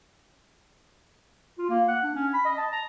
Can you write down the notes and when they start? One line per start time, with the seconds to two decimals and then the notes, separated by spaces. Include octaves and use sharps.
1.58 F4
1.69 A#3
1.88 F#5
2.03 D4
2.15 C#4
2.33 B5
2.45 D#5
2.58 A5
2.72 A#5